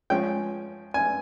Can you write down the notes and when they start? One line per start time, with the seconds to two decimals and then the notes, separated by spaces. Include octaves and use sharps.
0.10 F3 G#3 C#4 G5
0.94 G#5